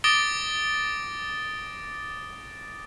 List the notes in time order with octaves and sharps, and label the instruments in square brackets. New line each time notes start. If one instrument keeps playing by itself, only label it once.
[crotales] D6 D#6 A6 A#6 D7 G7